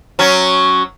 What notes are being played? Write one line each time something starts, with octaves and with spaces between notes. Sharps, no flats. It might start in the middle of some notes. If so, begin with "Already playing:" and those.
F#3 C#4